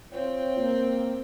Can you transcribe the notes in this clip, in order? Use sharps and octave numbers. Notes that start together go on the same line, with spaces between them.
C4 F4 C#5 G5
A#3